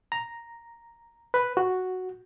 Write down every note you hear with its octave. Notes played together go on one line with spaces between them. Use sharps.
A#5
B4
F#4